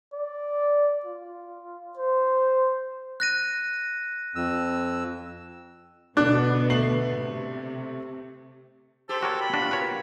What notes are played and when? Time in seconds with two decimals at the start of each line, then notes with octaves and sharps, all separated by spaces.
0.13 D5
1.05 F4
1.97 C5
3.20 F#6 A#6 D#7
4.36 F2 E6
6.17 B2 D3 B3 D4 D6 F#6
6.70 A3 C7 F#7
7.16 C3
9.09 G4 A4 C5
9.23 F#4 A#4 C#5 G5
9.41 B5
9.54 D4 F4 F#4
9.71 A#4 B4 C#5